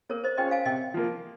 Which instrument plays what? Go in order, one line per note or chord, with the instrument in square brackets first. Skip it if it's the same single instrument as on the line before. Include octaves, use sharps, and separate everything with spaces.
[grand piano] A#3 [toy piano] A#4 C#5
[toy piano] C5 D#5
[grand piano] C#4 F4 G#4 C#5 [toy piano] D#5 G5
[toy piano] F5 G#5
[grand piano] C3 [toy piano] D#5 G5
[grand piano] F3 A#3